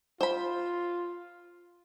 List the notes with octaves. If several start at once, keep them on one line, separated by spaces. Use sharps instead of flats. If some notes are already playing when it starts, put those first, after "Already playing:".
F4 C5 B5